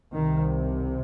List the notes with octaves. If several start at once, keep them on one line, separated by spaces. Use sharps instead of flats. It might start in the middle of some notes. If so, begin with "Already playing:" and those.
C2 C3 D#3